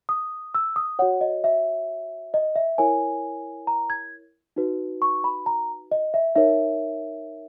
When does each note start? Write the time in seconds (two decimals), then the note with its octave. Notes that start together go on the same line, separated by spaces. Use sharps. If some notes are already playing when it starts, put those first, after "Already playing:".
0.09 D#6
0.54 E6
0.76 D#6
0.99 F#4 C#5 F#5
1.21 D#5
1.44 E5
2.34 D#5
2.56 E5
2.78 E4 A#4 C#5 G#5
3.67 A#5
3.90 G#6
4.56 D#4 F#4 B4
5.02 C#6
5.24 B5
5.46 A#5
5.91 D#5
6.14 E5
6.36 D#4 A#4 C#5 E5